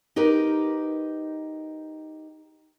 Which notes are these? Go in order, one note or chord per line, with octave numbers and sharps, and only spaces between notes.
D#4 G4 A#4 B4